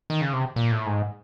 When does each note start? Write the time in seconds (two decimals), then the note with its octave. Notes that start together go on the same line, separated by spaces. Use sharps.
0.10 D#3
0.21 C#3
0.33 C3
0.56 A#2
0.72 A2
0.86 G#2